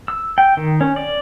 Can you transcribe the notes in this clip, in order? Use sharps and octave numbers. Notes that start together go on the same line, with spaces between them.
E6
G5
D#3
C#4
D5